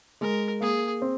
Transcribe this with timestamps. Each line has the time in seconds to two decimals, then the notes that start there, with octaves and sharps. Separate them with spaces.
0.21 G#3 A#4
0.60 A#3 G#4
1.02 C4